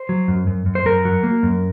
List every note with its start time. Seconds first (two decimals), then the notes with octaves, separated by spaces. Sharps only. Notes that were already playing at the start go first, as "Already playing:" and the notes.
Already playing: C5
0.09 F#3
0.28 F#2
0.47 F#2
0.66 F#2
0.75 C5
0.85 F#2 A#4
1.05 F#3
1.23 A#3
1.43 F#2